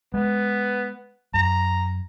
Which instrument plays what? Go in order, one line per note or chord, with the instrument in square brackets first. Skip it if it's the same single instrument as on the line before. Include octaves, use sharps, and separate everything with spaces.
[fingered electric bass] G#3 [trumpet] B3
[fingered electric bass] F#2 [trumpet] A#5